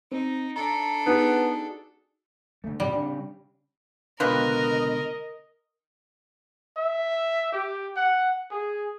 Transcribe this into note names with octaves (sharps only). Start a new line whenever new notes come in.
C4 D#4
D4 A4 A#5
B3 D#4 F#4 G#4
D3 A3
D2 A2 C3 G3
C#3 C4 D4
C#2 B2 D3 F4 G4 A#4 B4 D#5
E5
G4
F#5
G#4